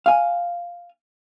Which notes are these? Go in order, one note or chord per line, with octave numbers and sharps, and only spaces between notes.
F5 G#5